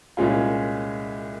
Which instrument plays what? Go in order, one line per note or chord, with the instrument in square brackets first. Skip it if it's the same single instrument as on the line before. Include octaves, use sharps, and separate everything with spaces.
[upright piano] C2 A#2 G#3 C#4 F4